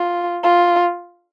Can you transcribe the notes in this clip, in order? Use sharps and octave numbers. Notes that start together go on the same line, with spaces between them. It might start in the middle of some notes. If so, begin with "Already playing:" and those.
Already playing: F4
F4